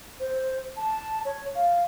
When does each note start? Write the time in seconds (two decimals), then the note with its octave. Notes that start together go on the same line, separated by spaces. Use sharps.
0.20 C5
0.77 A5
1.25 C#5
1.55 F5